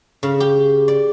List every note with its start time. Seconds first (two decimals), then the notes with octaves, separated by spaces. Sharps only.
0.23 C#3
0.40 G4
0.88 D5